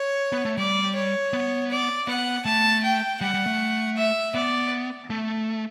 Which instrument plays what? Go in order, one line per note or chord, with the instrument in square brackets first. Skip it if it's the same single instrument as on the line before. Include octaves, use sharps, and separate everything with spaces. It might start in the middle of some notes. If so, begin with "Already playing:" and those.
Already playing: [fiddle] C#5
[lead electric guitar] B3
A3
[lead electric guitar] G3 [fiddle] D5
[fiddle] C#5
[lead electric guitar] B3
[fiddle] D5
[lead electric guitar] B3 [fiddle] F#5
[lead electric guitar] A3 [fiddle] A5
[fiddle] G5
[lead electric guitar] G3 [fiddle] F#5
[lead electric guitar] G3
A3
[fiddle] E5
[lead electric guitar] B3 [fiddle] D5
[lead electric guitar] A3